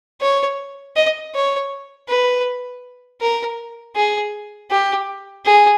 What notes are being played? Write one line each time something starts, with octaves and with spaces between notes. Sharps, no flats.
C#5
D#5
C#5
B4
A#4
G#4
G4
G#4